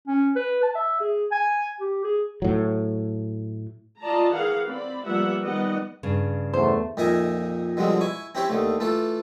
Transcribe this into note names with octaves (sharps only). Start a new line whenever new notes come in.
C#4
B4
A5
E5
G#4
G#5
G4
G#4
A2 F#3
F4 D5 D#5 A5 A#5
E3 G#4 A#4 F5 F#5
C4 D5 B5
F3 G3 A#3 B3 E5 F#5
D#3 G3 B3 G4 D#5 F#5
G2 C#3
E2 A3 C5
F2 A#2 D#4 A#4 E5 G#5
B2 D3 F3 G3 G#3 C4
E4 G#5 C#6
C4 C#4 E4 G4 C5 C#5
D#2 D3 A3
E3 A3 F4 A4